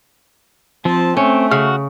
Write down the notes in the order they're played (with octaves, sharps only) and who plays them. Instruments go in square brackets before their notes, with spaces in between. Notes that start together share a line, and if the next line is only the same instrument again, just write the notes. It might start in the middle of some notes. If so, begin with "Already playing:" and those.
[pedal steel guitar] F3 C4 [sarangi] A5
[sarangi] A3 [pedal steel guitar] C4 [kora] C#4
[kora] C#3 [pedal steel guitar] F#4 F6